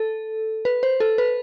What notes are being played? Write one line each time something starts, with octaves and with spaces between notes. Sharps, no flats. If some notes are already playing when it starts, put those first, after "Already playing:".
Already playing: A4
B4
C5
A4
B4